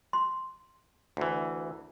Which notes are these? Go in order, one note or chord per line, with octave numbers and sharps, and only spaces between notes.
C6
D2 E3